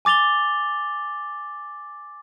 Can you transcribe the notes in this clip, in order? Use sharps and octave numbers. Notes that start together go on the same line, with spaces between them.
G#5 D6 A6 F7 G7